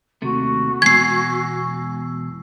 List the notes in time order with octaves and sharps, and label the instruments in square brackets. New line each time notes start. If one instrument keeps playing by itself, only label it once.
[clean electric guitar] D#2 C3 A3 [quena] F#4
[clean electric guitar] E2 B2 [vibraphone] G#3 E6 [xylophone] G#6 C7